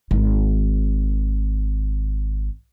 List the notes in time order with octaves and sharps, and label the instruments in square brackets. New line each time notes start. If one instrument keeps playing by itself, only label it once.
[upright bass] G#1 D#3